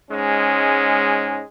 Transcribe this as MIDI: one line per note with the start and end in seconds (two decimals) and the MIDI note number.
0.10 1.40 44
0.10 1.40 56
0.10 1.40 61